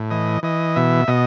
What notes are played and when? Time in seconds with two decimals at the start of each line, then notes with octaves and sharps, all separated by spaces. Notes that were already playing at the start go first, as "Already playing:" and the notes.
Already playing: A2
0.11 E3 D#5
0.43 E3 D#5
0.76 B2 E5
1.08 B2 D#5